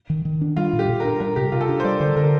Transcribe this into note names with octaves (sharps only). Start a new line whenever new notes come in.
D#3
D#3
D4
G3 F4
A#2
G4
A#2
D4 A#4
G3 A#4
C3 G4
C3 F4
A4
D4 G4
C5
G3 D5
D3 C5
D3 A#4